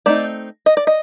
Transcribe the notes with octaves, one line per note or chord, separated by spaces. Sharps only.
A3 C4 D#4 D5
D#5
D5
D#5